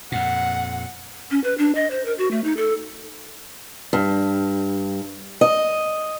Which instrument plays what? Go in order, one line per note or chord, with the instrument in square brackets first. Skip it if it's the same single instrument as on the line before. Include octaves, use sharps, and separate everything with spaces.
[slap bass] F2 A#2 [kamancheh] F#5
[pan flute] C#4
B4
D4
D#5
C5
A#4
F#4
A3
D#4
A4
[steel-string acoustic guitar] G2
D#5